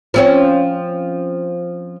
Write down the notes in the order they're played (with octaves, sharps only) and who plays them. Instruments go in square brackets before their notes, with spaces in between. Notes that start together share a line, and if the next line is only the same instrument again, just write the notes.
[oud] F3 C4 C#4